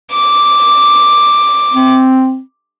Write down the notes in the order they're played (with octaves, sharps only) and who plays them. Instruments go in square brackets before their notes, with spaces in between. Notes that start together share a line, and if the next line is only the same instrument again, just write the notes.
[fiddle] D6
[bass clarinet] C4